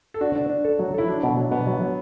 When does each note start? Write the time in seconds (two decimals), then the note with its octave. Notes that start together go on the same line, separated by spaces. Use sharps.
0.14 A4
0.21 D4 F#4
0.35 D4
0.49 D4
0.65 A4
0.79 F#3
0.94 E4 A4
1.08 F#3 D4
1.23 B2
1.37 F#3
1.51 B2 B3
1.67 F#3
1.81 F#3